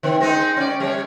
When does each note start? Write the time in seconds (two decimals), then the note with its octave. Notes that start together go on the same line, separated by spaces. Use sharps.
0.03 D#3 C4
0.20 G#3 C4 D#4
0.57 C#4 D5
0.80 G3 C#5